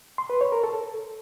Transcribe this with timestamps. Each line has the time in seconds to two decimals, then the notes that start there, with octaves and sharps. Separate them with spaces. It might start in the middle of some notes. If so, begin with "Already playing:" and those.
0.18 C6
0.30 B4
0.41 C#5
0.52 A#4
0.64 A4